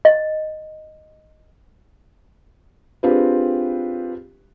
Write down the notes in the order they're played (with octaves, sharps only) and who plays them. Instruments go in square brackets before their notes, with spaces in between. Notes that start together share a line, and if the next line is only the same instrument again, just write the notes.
[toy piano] D#5
[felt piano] C4 D4 F4 G4 G#4 B4